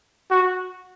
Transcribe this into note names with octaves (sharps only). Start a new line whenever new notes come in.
F#4